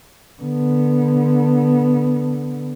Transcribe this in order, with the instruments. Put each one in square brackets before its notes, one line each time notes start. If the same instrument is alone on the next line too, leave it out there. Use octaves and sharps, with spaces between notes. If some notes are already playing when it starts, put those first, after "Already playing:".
[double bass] D3 B3